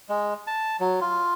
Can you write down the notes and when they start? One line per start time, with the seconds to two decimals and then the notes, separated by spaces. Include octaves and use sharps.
0.09 G#3
0.47 A5
0.80 F#3
1.01 F4